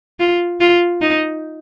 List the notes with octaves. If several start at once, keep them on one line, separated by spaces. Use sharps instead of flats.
F4
F4
D#4